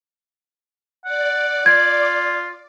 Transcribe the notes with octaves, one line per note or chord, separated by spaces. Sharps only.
D5 F#5
F4 G#6